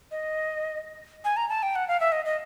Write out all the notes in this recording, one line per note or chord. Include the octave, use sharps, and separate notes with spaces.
D#5
G#5
A#5
A5
G5
F#5
F5
E5
D#5
D#5